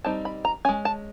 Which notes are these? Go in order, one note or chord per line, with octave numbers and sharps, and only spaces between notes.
G3 C4 D#4 A5
B5
A#5
G#3 C#4 G#5
A5